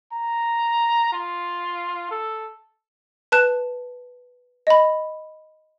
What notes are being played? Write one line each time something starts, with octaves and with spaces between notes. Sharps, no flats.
A#5
F4
A4
B4 A5 F#6 E7
D#5 B5